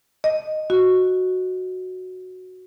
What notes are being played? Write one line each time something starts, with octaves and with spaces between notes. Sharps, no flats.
D#5
F#4